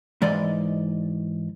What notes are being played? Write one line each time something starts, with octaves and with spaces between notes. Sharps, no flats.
G#2 E3 D5 D#5